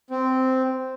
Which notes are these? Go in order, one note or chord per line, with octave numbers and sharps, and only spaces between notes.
C4